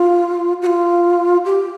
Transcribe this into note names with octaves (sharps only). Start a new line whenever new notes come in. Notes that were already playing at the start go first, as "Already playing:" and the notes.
Already playing: F4
F#4
F4
G4